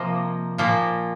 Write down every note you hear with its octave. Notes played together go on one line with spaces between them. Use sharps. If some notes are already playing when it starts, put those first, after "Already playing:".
Already playing: C3 F3 A#3 D#5
A#2 F3 A#3